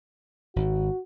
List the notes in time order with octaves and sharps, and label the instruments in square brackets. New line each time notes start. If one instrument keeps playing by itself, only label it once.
[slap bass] G#1 [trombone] F#4